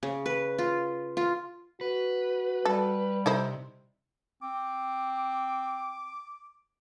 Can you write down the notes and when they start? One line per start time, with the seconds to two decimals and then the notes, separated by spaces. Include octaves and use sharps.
0.03 C#3
0.26 B4
0.58 F4
1.17 F4
1.81 F#4 B4
2.65 G3 A4
3.26 C3 D#4 E4 C5
4.43 C4 D6